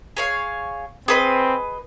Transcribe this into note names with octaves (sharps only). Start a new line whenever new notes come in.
G#4 C#5 F5
C4 G#4 B4 D#5